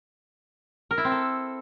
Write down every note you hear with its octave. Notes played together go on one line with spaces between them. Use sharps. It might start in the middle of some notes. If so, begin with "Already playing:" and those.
A#4
E4
C4
A4